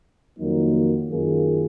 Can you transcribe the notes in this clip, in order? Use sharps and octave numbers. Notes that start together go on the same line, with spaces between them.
F2 D#3 F#3 A#3 D#4
F#2 D#3 A#3 F4 G#4